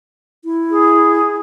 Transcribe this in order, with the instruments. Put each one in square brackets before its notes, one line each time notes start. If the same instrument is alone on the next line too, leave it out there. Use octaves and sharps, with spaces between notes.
[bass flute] E4
[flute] G#4